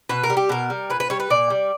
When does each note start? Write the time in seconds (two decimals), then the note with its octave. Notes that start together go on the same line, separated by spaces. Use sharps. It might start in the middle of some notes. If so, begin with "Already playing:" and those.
0.09 B2 B4
0.24 A#4
0.30 G3
0.37 G4
0.49 B2 A#4
0.70 G3
0.90 A#2 B4
1.00 B4
1.10 G3 C#5
1.20 B4
1.30 A#2 D5
1.50 G3